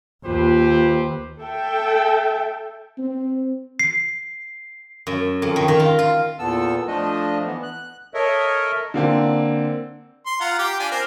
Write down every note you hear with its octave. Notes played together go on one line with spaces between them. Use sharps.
D#2 F4 G4 B4 C5
A4 E5 G5
C4
C7
F#2
F2
D#3
D#3
F4
F4
E2 A#2 B3 A4 E6
F3 A3 D4 D#5
E3 B3
F#6
A4 A#4 C#5 D#5 E5
D3 A#3 C4
C6
F4 F#5 A#5
G4 G5 D6
D4 F4 G#5
C4 A#4 C5